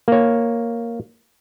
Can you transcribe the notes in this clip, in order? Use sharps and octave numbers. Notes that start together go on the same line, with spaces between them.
A#3 C#5